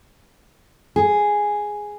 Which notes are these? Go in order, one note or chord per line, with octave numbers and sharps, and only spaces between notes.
G#4